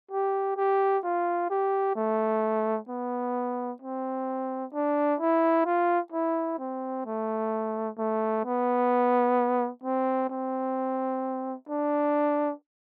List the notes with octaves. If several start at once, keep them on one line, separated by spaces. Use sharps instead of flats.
G4
G4
F4
G4
A3
B3
C4
D4
E4
F4
E4
C4
A3
A3
B3
C4
C4
D4